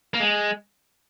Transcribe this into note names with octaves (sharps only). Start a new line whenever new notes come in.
A#3
G#3